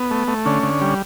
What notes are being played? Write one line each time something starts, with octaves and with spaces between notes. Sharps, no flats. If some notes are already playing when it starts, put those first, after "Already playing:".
Already playing: B3
A3
A3
D3 C#4
D3
G3